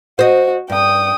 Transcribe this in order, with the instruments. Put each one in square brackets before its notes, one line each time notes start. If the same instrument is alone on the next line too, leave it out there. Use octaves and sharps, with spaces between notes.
[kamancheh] F#4 [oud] C5 D#5
[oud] G2 [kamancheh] G5 D#6